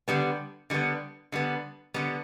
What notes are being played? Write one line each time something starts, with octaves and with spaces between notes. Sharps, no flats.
D3 G3 B3
D3 G3 B3
D3 G3 B3
D3 G3 B3